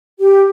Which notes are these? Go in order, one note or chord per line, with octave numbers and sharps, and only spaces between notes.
G4